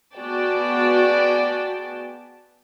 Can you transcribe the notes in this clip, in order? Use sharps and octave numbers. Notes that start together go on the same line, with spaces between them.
B3 F#4 G#4 D5 G5 A5